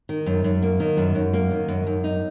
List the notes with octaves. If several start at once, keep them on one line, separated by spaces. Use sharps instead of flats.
D#3
F#2
F#2
A#3
D#3
F#2
F#2
A#3
D#3
F#2
F#2
D#4